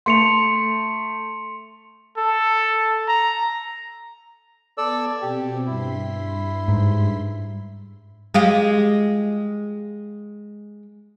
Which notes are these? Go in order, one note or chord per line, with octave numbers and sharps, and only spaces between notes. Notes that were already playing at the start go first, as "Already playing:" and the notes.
A3 C6 C#7 F7
A4
A#5
B3 A4 D5 E6 G#6
B2 C4 G4
G2 E4 C6 B6
G#2
G#3 F4 G4